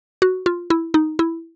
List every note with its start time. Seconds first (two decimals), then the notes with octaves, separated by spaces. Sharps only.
0.22 F#4
0.46 F4
0.70 E4
0.94 D#4
1.19 E4